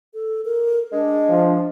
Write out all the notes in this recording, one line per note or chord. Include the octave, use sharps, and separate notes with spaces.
A4
A#4
G#3 D4
F3